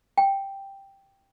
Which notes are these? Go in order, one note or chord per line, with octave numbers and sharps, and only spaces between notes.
G5